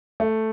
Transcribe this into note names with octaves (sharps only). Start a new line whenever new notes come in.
A3